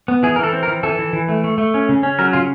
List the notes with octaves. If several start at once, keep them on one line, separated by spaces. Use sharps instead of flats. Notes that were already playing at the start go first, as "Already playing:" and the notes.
B3
E3 G#4
A#4
E3 A4
C4
A#4
E3
E3 A4
E3
E3
A3
A3
A3
C#4
C#3
C#4
F#3 A#4
C#3 F4